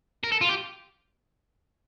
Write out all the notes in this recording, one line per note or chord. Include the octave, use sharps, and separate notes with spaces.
A#4
A4
F4
G4